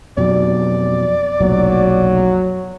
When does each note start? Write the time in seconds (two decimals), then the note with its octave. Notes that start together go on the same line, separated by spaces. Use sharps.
0.17 F2 B2 F#3 D5
1.40 F1 B1 A#2 F#3